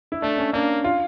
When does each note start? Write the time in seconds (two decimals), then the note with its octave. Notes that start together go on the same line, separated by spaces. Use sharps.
0.12 E4
0.22 A3 D4
0.38 C#4
0.53 A#3 D4
0.84 F4